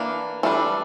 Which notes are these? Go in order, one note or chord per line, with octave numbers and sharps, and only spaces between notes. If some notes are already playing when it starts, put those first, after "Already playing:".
Already playing: E3 A#3 D4
E3 G3 D4 A4